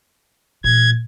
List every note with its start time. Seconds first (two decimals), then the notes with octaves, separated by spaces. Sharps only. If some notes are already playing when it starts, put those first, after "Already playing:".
0.64 A#2 E3 G#6